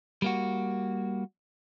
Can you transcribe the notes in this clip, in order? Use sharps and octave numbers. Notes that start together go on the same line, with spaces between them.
G3 A#3 F#4